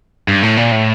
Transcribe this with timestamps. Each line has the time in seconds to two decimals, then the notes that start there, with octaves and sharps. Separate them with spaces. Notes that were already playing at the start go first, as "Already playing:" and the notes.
0.28 G2
0.43 A2
0.57 A#2
0.71 A2